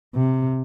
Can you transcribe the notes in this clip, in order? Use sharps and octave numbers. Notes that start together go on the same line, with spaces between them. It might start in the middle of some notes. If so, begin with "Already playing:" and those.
C3